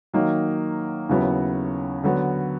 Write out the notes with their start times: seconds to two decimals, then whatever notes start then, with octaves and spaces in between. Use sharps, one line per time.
0.13 D#3 F#3 A#3 D#4
1.09 D#2 C#3 F#3 B3 E4
2.03 D3 F#3 B3